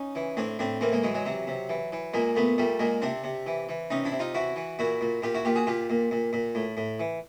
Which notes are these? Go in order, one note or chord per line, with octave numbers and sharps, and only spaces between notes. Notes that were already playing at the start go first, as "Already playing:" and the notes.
Already playing: C#4 D#4
E3
A2 C4 D4
A2 C4 D4
E3 A#3 C4
G#3 A#3
E3 F#3 G#3
F#3 G#3
C3 F#3
C3
E3
E3
A#2 G#3 A#3
A#2 A3 B3
A#2 G3 A3
A#2 G#3 A#3
C3 C4 D4
C3
E3
E3
C3 C#4 D#4
D4 E4
C3
D#4 F4
E3 E4 F#4
E3
A#2 E4 F#4
A#2
A#2 F4 G4
E4 F#4
A#2 F4 G4
F#4 G#4
A#2 F4 G4
A#2
A#2
A#2
A2
A2
E3